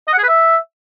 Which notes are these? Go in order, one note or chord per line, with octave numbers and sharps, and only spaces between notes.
D#5
F#5
G#4
B4
E5